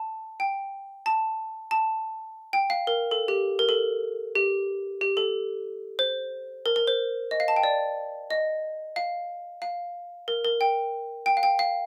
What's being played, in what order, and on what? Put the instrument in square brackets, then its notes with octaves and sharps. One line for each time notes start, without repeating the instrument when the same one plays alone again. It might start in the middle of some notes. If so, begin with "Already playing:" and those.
Already playing: [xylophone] A5
G5
A5
A5
G5
F5
A#4
A4
G4
A#4
A4
G4
G4
A4
C5
A#4
A#4
C5
D#5
F5
A5
G5
D5
D#5
F5
F5
A#4
A#4
G5
G5
F5
G5
F5